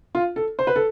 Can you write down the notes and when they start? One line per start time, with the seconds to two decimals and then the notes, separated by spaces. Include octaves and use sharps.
0.15 F4
0.36 A4
0.59 C5
0.67 B4
0.76 A4